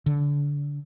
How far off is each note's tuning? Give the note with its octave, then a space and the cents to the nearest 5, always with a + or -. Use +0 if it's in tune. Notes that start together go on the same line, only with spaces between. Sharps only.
D3 -25